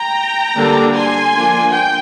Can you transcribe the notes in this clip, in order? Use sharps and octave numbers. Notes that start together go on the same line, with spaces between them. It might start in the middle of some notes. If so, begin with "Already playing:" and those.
Already playing: G5 A#5
D3 G3 A#3 D4
G#5 C6
F3 A#3 D4
G5